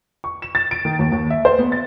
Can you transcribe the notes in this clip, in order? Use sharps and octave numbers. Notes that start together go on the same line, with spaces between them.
C#6
E7
A6
D7
D#3
D#2
D#2
E5
C5
B3
A6